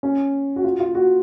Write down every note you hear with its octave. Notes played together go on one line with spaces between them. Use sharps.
C#4
F#4
F4
F4
F#4